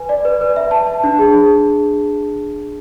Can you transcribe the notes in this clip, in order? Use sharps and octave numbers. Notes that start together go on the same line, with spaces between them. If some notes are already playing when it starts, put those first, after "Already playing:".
Already playing: B4 G#5
D5
B4
B4
E5
A5
A5
D4
G#4